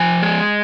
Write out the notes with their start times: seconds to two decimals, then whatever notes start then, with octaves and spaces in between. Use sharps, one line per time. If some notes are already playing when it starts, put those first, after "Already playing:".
Already playing: F3 G#5
0.23 G#3